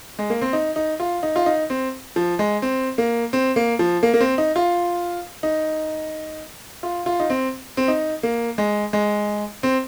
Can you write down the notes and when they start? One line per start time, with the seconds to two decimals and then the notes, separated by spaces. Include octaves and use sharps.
0.19 G#3
0.30 A#3
0.42 C4
0.53 D#4
0.76 D#4
1.00 F4
1.23 D#4
1.36 F4
1.46 D#4
1.70 C4
2.16 F3
2.39 G#3
2.62 C4
2.98 A#3
3.33 C4
3.56 A#3
3.79 F3
4.03 A#3
4.14 A#3
4.21 C4
4.38 D#4
4.56 F4
5.43 D#4
6.83 F4
7.06 F4
7.20 D#4
7.30 C4
7.77 C4
7.88 D#4
8.23 A#3
8.58 G#3
8.93 G#3
9.63 C4